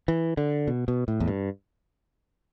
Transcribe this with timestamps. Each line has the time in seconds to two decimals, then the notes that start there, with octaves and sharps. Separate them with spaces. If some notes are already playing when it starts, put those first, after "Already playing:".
0.08 E3
0.37 D3
0.67 B2
0.88 B2
1.08 A2
1.20 E2
1.28 G2